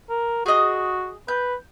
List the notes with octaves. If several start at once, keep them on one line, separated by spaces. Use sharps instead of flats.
A#4
F#4 G#4 D#5
B4 G6